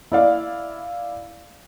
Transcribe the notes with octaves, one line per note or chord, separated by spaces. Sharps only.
E4 D5 F5